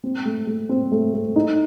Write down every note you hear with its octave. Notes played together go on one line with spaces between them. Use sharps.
C4
A3
A3
C4
A3
A3
D#4